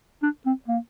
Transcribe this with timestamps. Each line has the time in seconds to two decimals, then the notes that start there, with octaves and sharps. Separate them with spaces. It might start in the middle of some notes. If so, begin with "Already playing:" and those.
0.23 D4
0.46 C4
0.68 A#3